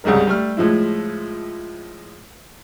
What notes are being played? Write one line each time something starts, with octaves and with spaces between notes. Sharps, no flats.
C2 C#3 G3 G#3 A#4
G3 A3 F6
A2 F3 G#3 E4